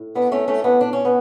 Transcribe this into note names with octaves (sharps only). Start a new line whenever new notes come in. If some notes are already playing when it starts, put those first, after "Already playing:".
Already playing: A2
B3 D4
A3 C#4
A3 C#4
B3 D4
D4
C#4
B3